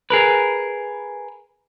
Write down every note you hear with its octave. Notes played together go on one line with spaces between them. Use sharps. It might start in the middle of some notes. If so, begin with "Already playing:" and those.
G#4 A#4 B4